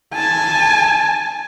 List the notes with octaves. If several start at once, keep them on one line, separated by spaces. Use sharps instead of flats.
G#5 A5